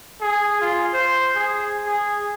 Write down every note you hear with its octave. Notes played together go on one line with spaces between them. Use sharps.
G#4
F4
C5
G#4
G#4